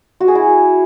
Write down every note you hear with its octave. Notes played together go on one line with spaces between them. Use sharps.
F#4
G#4
E4